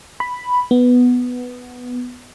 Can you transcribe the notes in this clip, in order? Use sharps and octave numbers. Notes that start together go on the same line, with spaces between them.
B5
B3